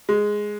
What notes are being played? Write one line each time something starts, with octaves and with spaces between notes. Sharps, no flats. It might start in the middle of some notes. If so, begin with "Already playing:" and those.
G#3